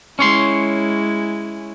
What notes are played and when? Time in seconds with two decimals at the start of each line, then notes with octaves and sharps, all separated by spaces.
0.19 G#3 C#4 E4 C#5 C6